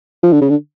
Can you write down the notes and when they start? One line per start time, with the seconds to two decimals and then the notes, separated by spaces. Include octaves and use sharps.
0.23 F3
0.33 D3
0.41 C#3
0.49 D3